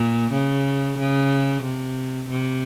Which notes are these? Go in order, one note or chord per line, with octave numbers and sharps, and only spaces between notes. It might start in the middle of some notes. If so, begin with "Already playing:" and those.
Already playing: A#2
C#3
C#3
C3
C3